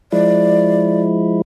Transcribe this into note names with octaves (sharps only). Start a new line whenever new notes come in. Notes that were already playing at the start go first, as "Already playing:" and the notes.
F3 G#3 E4 D5